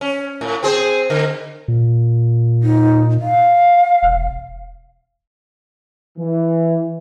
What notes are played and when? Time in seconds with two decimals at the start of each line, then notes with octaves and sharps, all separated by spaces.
0.01 C#4
0.41 A2
0.63 C4 G#4 C5
1.10 D3
1.68 A#2
2.63 D#4
3.21 F5
4.03 E1
6.18 E3